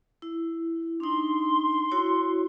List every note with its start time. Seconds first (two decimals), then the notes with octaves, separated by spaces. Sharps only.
0.22 E4
1.00 D4 D#4 C6
1.91 E4 F#4 C#5